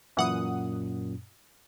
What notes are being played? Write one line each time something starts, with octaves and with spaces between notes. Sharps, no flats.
F#2 A#2 E3 F#5 D#6